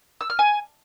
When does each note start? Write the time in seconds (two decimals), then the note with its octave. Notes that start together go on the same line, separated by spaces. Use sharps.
0.21 E6
0.30 F6
0.39 G#5